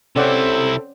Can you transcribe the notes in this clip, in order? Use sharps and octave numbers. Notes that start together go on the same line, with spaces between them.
C3 C4 C#4 E4 A4 D5 F#5